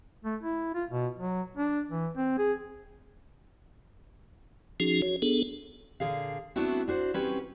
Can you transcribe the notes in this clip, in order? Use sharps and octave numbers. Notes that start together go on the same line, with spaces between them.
A3
E4
F4
B2
F#3
D4
E3
C4
G#4
F3 C#4 D#4 F#4 G#4
F#4 C#5
B3 D4 G#4 A4
A#2 D3 G#4 F5
A3 B3 C4 D4 E4 F#4
D4 F#4 C5
F#3 C4 C#4 G4 B4